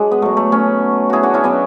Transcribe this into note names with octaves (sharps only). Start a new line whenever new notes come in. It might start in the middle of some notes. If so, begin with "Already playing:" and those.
Already playing: F#3 G#3 D4
B3
B2 F#3 A3
A3
A3 C#4
E4 F#4 G#4
D4 F#4
C#4 E4
B2 F#3 B3 D4